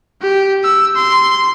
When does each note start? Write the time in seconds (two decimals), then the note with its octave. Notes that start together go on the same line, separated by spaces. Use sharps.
0.22 G4
0.64 E6
0.96 C6